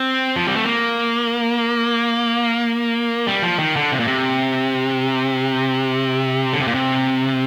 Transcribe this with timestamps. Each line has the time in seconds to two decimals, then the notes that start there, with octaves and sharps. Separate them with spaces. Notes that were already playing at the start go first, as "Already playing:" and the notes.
Already playing: C4
0.36 F3
0.47 G3
0.56 A3
0.66 A#3
3.27 G3
3.43 F3
3.59 D#3
3.76 D3
3.92 C3
4.00 A#2
4.08 C3
6.53 D3
6.60 C3
6.68 A#2
6.74 C3